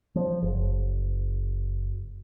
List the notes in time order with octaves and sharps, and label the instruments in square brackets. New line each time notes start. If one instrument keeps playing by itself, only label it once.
[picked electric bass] F3
F#1